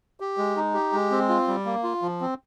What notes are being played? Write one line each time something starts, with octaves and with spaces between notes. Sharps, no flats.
G4
G#3
D#4
G4
G#3
C4
F4
G3
A#3
F4
F3
C4